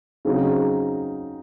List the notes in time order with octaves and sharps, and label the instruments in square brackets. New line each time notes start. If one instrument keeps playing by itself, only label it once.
[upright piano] C#3 F#3 C4 D#4